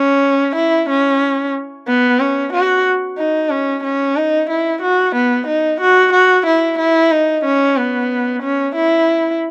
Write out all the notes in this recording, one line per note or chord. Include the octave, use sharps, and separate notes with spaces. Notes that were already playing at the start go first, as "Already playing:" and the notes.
Already playing: C#4
E4
C#4
B3
C#4
F#4
D#4
C#4
C#4
D#4
E4
F#4
B3
D#4
F#4
F#4
E4
E4
D#4
C#4
B3
C#4
E4